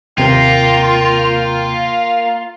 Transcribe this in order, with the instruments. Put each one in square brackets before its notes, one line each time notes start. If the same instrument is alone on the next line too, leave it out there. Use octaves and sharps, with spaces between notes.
[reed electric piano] D#2 C3 A#4 [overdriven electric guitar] A#3 [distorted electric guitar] F4 [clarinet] G5